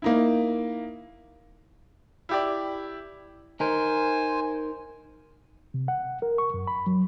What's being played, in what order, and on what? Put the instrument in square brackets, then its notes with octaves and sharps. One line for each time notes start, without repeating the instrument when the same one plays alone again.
[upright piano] A#3 D#4 E4
[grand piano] E4 G4 D5
[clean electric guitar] D#4 A#4 [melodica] C5 G#5
[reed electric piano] C3
F#5
A#4
C#6
F#2
B5
F#3